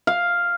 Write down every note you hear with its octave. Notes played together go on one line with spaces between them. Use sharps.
F5